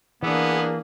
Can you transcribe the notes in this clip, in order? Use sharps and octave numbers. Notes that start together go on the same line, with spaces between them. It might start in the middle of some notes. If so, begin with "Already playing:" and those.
E3 A#3 B3 D4 G#4